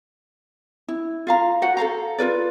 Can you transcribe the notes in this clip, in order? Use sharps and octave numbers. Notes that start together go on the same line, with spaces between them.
E4
F4 F5 A#5
F#4 C5 F#5
A4 C5 F5 A#5
F4 A#4 B4 D5